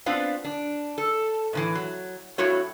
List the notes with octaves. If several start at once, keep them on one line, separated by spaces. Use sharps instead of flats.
B3 C4 D4 F4 B4
D4
A4
A2 D#3 E3
F#3
G2 G3 A3 E4 F#4 C#5